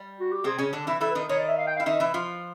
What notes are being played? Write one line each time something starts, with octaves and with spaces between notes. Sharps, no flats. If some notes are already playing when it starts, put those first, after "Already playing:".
Already playing: G3
F#4
G4
C3 C4 G#4
C#3 C#4
D3 D4
E3 E4
E3 E4 A4
B4
D#3 D#4
D#3 D#4 C#5
D5
E5
F5
G5
F5
E4
D#3 D#4 E5
E3 E4
F3 F4